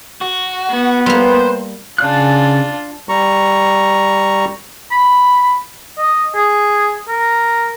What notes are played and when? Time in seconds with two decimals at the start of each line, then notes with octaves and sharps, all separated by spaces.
0.21 F#4
0.69 B3
1.06 G3 A#3 B4 C5
1.98 C#3 D4 F4 F#6
3.09 G3 A#5 C#6
4.91 B5
5.98 D#5
6.35 G#4
7.09 A#4